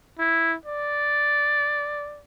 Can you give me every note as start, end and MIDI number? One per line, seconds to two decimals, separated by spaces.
0.19 0.56 64
0.66 2.22 74